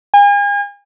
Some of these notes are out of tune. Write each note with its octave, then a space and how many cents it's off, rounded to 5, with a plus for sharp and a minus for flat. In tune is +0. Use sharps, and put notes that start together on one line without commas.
G#5 -40